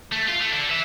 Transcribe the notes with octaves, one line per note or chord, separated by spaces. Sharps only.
A3
F4
A3
D4 A4
B4 E5